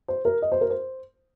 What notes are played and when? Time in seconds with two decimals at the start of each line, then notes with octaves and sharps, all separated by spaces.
0.08 C5
0.25 A#4
0.42 D#5
0.52 C5
0.61 A#4
0.70 C5